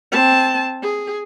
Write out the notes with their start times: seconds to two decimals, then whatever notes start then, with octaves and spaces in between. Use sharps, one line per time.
0.12 C4 A5
0.82 G#4